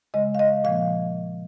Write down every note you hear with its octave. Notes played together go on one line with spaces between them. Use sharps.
C#3 G#3 D#5
F5
D#5
A#2 F3 A#3 F5